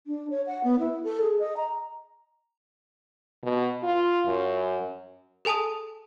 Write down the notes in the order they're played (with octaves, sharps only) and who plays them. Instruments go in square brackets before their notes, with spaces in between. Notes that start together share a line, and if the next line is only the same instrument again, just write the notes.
[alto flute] D4
C#5
F#5
B3
E4
A4
G#4
D#5
A#5
[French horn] B2
F4
F#2
[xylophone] G#4 A4 G#5 A5 D#6